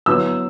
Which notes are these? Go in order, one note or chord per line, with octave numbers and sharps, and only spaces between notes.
F#3 B3 E4 E6